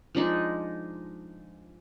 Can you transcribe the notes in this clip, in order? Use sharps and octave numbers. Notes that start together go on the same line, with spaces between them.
F3 G#3 D4 D#4